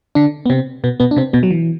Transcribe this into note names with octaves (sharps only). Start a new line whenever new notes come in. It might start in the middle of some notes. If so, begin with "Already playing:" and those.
D3 D4
B3
C3 C4
B2 B3
B2 B3
D4
C3 C4
B2 B3
F#3
E3